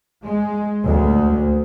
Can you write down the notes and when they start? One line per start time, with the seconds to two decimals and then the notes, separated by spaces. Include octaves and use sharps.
0.22 G#3
0.89 D2